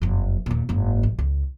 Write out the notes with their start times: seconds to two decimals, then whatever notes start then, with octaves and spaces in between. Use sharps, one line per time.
0.02 F#1 F2
0.46 D#1 A#2
0.69 F#1 G#2
1.03 A1
1.19 C#2